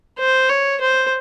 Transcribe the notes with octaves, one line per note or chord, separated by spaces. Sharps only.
C5
C#5
C5